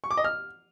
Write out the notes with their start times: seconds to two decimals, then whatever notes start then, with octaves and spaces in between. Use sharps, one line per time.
0.04 C#6
0.11 D6
0.17 D#5
0.24 F6